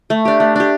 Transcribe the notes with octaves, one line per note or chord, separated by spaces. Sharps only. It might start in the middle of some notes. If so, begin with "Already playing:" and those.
A3
D4 G4
A3
D4 G4